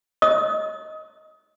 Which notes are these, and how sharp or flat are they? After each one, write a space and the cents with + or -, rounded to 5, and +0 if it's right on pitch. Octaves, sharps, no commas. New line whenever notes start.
D#5 +0 D#6 +25